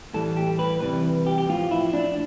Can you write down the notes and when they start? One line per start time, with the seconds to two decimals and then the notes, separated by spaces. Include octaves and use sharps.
0.13 A2 E3 G3 A4
0.37 G4
0.59 B4
0.81 C3 E3 G3 B4
1.26 G4
1.38 G4
1.48 A2 F3 F4
1.71 E4
1.93 D4